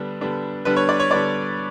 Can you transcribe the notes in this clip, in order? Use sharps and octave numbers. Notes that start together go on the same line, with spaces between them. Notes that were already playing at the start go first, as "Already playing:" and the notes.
Already playing: D3 G3 B3 D4
D3 G3 B3 D4
D3 G3 B3 D4 B4
C#5
D5
C#5
D3 G3 B3 D4 D5